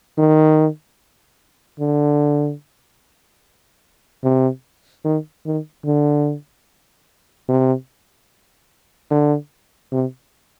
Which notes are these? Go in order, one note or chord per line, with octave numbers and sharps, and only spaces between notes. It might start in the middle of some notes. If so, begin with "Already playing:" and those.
D#3
D3
C3
D#3
D#3
D3
C3
D3
C3